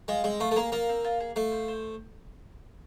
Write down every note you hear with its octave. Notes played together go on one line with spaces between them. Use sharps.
G#3 F4
G#3 C4
A3 F4
A3
A#3 G#4
A#3 F4
C4
F4
G#4
A3 F5
C5
C5